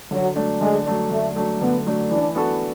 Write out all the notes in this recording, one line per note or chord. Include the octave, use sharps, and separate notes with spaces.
D3 F#3
F#3 A3 D4
D3 G#3
F#3 A3 D4
D3 A3
F#3 A3 D4
D3 B3
F#3 A3 D4
E3 D4
B3 D4 F#4 A4